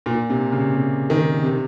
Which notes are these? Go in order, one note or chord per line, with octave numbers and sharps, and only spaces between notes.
A#2
C3
C#3
C3
D#3
C3